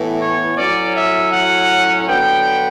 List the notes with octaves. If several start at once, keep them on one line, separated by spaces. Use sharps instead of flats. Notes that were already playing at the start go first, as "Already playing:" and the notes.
Already playing: A2 E3 B3
C#5
A2 F#3 C#4 D5
E5
F#5
D3 F#3 B3 G5